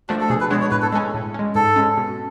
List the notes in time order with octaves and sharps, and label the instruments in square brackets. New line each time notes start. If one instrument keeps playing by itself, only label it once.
[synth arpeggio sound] F3 A3 D4 [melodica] F#4
[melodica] A4
[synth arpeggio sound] B2 [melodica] G#4
[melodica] B4
[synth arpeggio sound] G#3 B3 D4 [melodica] C#5
[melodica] C#5
[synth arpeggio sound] A2 [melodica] B4
[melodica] A4
[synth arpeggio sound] G#3 [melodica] A4
[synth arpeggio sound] C#4
A2
G#3 C#4
[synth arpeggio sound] G#2 [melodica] A4
[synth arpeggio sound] G#3 C#4
B2